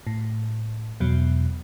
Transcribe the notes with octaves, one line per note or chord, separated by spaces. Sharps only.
A2
E2 B2 F#3